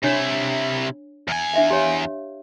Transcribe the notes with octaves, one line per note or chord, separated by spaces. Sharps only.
C3 D4 E4 C#5
E2 G#5
D4 E5 F5
G4 C#5 F5